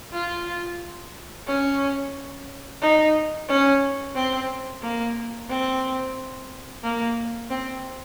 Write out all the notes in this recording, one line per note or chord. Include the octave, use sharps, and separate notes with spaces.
F4
C#4
D#4
C#4
C4
A#3
C4
A#3
C4